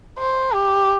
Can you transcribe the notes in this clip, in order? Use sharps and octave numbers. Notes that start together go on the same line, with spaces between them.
C5
G4